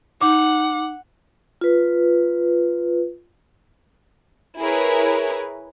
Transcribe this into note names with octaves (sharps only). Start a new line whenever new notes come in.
D#4 F#5 D6
F4 B4
E4 G#4 A#4 B4 C#5